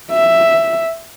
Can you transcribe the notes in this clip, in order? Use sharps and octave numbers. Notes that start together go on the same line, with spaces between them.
E5